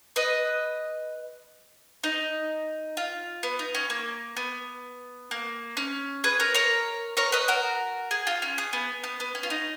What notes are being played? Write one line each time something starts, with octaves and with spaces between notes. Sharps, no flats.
B4 D#5
D#4
F4
B3
D#4
C#4
A#3
B3
A#3
C#4
G#4 B4
A#4 C#5
A#4 C#5
A#4 C#5
B4 D#5
F#4 A#4
G#4
F4
C#4
G#4
B3
B3
B3
C#4
F4
D#4